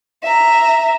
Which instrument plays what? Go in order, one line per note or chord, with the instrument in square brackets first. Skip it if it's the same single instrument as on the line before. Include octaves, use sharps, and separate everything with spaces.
[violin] E5 A#5